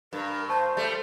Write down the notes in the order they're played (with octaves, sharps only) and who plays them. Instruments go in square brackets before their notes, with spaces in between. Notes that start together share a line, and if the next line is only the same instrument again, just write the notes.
[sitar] G2 [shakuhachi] A#4
[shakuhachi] C5 [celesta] A5 C#6
[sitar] G3 A3